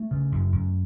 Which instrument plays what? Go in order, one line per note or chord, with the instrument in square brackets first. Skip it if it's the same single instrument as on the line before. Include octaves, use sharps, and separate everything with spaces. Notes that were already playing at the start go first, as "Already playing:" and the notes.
Already playing: [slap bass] A3
C#3
F#2
F#2